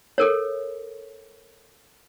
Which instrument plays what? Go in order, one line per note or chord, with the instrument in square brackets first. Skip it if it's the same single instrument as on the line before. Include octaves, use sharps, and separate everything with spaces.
[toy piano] A4 A#4 C#5